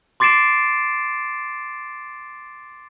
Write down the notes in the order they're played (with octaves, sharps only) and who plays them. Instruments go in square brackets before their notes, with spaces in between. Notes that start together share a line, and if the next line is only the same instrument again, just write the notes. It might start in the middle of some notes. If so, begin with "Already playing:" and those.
[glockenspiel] C6 D6 A6 C7 D7 E7